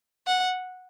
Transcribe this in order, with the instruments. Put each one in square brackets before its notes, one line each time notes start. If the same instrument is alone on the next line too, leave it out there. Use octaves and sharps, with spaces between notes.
[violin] F#5